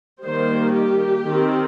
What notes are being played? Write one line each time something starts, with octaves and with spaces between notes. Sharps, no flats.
D#3 G3 A#3 C5
G4
D#3 C4